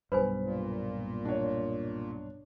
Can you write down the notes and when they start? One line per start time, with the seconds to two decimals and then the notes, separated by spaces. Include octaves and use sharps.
0.12 B1 G2 B4 C5 G#5 B5
0.44 A#2
1.25 D4 C#5